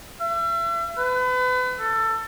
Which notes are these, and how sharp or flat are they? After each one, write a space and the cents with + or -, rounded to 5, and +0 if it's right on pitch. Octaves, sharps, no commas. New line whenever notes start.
E5 +40
B4 +35
A4 +20